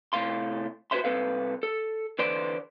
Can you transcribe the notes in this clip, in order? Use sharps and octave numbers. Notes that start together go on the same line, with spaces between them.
A2 C3 A3 F5 C6
F#4 G#4 B4 C5 E5 C6
C2 C4 A4 B4 F5
A4
D3 E3 B4 C5 D5 C6